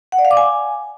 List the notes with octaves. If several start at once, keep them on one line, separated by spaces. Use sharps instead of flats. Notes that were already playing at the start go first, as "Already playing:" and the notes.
F#5
D5
F5
D6
G#5